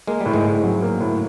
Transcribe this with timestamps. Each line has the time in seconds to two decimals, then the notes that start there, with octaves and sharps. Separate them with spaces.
0.08 G#3 A#3
0.20 G3
0.26 A2
0.33 G#2 G#3
0.45 A2
0.64 F#3
0.82 A#3
1.01 A2